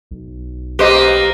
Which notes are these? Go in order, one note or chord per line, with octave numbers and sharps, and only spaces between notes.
B1
A#3 G4 B4 C5 D#5